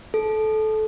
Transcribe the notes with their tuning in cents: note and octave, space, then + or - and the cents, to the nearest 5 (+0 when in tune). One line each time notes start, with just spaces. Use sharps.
A4 -20